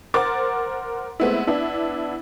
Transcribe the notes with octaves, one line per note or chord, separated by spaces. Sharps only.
A#4 C5 F#5 D6 A6
G#3 A3 B3 C4 E4
B3 D4 E4